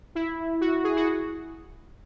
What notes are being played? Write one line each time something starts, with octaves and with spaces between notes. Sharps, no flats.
E4
F#4
G#4
F#4